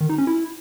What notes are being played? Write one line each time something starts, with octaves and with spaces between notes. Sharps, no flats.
D#3
D#4
C#4
E4